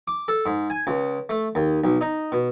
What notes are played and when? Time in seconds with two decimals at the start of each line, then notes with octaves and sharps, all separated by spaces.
0.08 D6
0.28 A4
0.46 G#2
0.70 G#5
0.87 C#2
1.29 A3
1.55 D#2
1.84 B1
2.01 D#4
2.32 B2